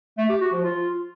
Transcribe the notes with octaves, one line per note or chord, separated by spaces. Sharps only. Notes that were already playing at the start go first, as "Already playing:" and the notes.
A3
G4
F#4
F3
F4